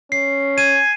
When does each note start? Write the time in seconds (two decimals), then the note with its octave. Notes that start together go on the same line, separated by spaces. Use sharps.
0.12 C#4 C7
0.58 G#5 D#7